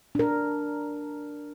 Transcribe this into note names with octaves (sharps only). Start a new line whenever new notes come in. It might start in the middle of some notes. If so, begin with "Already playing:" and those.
D4 A#4